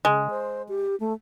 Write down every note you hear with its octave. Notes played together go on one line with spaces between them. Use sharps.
C#3 G#3
C5
G4
A3